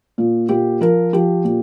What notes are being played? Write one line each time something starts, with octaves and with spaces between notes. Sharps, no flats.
A#2
A#2 G4
F3 A#4
F3 G4
A#2